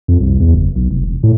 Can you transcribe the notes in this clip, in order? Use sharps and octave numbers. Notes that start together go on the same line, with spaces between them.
F2
C2
E2
F#1
B1
F1
E1
A2